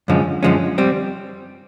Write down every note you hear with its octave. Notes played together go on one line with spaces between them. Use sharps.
F#2 D3 F3 G#3 C#4
F#2 D3 F3 G#3 C#4
G3 C4